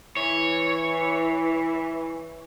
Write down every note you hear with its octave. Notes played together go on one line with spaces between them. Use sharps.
E3 C#5